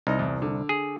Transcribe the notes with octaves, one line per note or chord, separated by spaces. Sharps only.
C2 D#4 D#5
E2
D3
G#4